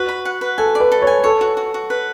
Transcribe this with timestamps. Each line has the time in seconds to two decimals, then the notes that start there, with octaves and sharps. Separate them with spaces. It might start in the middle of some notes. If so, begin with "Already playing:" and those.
Already playing: F#4 B4
0.09 B5
0.25 F#5
0.41 B4
0.58 A4 G#5
0.75 D5
0.80 B4
0.92 A4
1.02 C#5
1.07 G#5
1.24 A4 C#5
1.41 F#4
1.57 F#4
1.74 F#4
1.90 B4